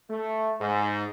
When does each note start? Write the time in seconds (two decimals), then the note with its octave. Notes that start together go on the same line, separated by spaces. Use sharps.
0.11 A3
0.61 G#2